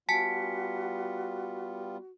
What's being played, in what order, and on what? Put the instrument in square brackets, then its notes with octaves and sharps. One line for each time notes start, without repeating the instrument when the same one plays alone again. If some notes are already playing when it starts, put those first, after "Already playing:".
[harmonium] G3 B3 F4 [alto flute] F#4 [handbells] G#5 A5 [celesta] B6 C#7